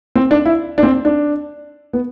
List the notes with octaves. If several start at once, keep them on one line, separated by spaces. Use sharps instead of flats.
C4
D4
E4
D4
C4
D4
B3